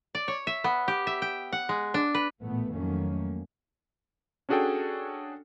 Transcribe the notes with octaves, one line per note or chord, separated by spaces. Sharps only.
D5
C#5
E5
B3
G4
E5
G5
F#5
G#3
D4
B4
A1 A#2 A3 B3
F2 D#3 F#3 A3 A#3 C#4
C#4 D4 F#4 G#4 A4 G5